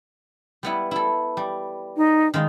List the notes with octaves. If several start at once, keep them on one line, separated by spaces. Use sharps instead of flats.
G3 B3 E4
E4 A4
G3
D#4
D#3 G#3 F4